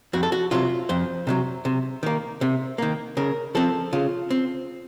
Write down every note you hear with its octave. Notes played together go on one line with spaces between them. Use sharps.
F2 F#4
A4
F#4
C3 D#3 F#3 F4
F2 C5
C3 D#3 F#3
C3
D#3 A#3
C3
D#3 A#3
C#3 A#4
F3 C4 A4
C#3 F4
C4